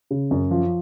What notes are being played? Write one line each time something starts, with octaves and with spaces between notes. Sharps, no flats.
C#3
F#2
F3